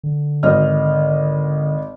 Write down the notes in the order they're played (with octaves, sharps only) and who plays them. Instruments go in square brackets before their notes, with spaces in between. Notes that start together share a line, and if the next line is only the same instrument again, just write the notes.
[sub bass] D3
[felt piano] G#1 D#5 F6